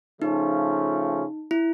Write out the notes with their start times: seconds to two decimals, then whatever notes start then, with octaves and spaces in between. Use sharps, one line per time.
0.22 C#3 F3 A3 C#4 D#4 F4
1.51 E4